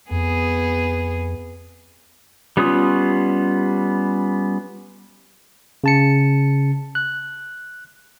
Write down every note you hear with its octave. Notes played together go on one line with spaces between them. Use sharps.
F2 B3 G#4
G3 B3 C#4 F4 D#6
C#3 A5 C#7
F#6